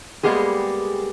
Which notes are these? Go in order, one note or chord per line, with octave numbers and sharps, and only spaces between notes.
G3 G#3 A#3 B3 G4 G#4